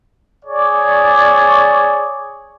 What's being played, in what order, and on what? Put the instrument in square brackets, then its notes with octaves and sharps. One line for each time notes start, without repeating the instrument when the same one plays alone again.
[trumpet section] G#4 C#5 D5